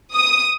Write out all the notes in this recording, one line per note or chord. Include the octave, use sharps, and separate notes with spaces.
D#6